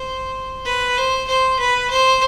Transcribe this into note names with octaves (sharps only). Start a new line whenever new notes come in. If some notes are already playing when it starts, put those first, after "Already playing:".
Already playing: C5
B4
C5
C5
B4
C5